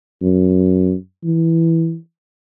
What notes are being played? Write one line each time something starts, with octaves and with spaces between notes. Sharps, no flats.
F#2
E3